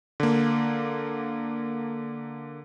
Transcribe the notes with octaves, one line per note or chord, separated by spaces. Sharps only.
D3 A#3